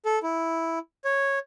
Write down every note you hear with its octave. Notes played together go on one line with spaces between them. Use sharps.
A4
E4
C#5